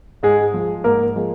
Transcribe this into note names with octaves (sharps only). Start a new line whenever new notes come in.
G#2 G#3 G#4
F3 G#3
G#2 A#3 A#4
F3 G#3